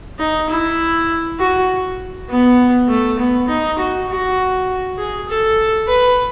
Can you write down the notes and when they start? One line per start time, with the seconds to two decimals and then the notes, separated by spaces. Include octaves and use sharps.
0.19 D#4
0.49 E4
1.39 F#4
2.29 B3
2.88 A3
3.19 B3
3.48 D#4
3.78 F#4
4.09 F#4
4.98 G#4
5.29 A4
5.88 B4